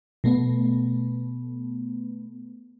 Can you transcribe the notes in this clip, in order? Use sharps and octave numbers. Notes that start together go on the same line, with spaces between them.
B2 A3 B3